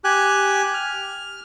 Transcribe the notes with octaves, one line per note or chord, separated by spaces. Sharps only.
G4 G#5 F#6
F6